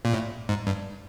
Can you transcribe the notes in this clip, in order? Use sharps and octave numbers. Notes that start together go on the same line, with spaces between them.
A#2
A2
G#2
G2